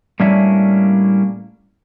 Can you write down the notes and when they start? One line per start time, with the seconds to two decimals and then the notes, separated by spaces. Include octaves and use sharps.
0.20 A2 G3 A#3 C#4 D4 E5